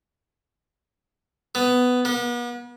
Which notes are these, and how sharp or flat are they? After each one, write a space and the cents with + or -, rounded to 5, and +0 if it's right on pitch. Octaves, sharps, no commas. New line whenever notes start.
B3 +10
B3 -40